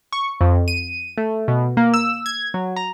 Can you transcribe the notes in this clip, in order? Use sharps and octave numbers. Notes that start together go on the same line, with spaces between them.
C#6
F2
D#7
A3
B2
A#3
E6
G#6
F#3
A#5